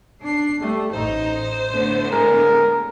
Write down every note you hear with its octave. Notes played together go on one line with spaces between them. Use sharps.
D4 C7
G3 A3
A1 D#4 C5
A2 D3 B3
G#3 A#4